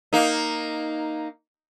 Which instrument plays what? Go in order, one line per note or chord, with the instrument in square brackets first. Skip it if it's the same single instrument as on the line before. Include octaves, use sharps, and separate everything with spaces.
[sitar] A#3 D#4